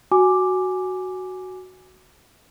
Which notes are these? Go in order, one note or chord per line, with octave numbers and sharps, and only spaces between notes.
F#4 G#5 D6